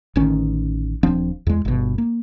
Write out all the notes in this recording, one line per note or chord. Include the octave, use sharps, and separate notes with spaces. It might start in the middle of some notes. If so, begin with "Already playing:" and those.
A1 D3 D#3 C#4
D#1 F3 C4 D4
E2 G#3
G1 B2
A#3